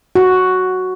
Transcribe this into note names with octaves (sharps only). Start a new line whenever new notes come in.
F#4